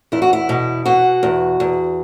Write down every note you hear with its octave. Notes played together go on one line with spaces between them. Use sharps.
E2 E4
F#4
E4
B2
B2 F#4
E2
E2